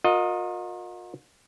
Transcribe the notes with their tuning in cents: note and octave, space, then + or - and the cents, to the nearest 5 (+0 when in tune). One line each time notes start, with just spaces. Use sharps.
F4 +45 A#4 +0 D#5 +0